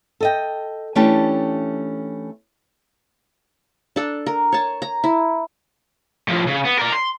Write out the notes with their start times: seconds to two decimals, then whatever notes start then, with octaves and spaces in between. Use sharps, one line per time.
0.21 A4 D#5 G5
0.95 E3 A3 C#4 D4 G4 A5
3.96 D4 A4
4.26 A#4
4.52 C#5 A5
4.82 A#5
5.04 E4
6.28 A2 F3
6.47 C#3
6.65 B3
6.79 A#4 D5
6.92 C6